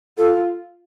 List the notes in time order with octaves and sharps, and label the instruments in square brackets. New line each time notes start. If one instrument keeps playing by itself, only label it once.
[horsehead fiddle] F4 [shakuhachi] A4